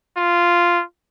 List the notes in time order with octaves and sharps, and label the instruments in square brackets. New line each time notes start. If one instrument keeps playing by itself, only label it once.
[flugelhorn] F4